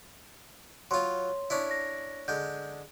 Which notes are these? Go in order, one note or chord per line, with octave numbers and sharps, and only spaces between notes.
F#3 F4 C#5 C6
C#4 D4 E4
A#6
D3 G#3 G6